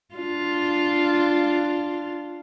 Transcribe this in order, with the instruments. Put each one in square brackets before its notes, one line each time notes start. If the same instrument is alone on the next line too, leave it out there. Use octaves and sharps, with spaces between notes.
[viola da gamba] D4 F4